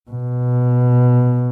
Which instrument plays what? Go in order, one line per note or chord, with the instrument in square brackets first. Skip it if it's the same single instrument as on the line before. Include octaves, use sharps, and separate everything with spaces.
[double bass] B2